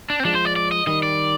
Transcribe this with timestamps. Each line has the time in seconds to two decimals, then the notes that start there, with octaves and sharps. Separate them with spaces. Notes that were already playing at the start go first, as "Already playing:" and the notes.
0.10 D4
0.20 C4
0.25 F3 G#3 D4
0.35 C5
0.45 D5
0.56 D5
0.72 D#5
0.87 D#3 G3 D#5
1.03 D5